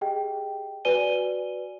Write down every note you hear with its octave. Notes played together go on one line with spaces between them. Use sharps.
G4 G#4 D#5 G5
F#4 B4 D5 G#5 D#7 G7